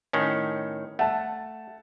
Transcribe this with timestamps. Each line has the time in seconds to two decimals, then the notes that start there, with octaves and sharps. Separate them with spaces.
0.13 A2 D#3 C#4
0.99 A3 F#5 A5